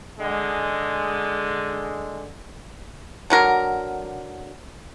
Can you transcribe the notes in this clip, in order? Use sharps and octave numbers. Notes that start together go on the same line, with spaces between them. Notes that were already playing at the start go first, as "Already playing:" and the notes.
D3 G#3
D3 F#3 A#4